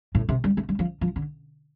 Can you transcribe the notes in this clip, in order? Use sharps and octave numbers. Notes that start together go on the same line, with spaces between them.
A2
C3
G3
A3
G3
F3
F3
D3